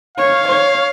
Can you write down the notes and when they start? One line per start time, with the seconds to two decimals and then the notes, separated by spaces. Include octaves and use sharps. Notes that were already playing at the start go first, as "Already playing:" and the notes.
0.17 C#5 F5
0.48 C#5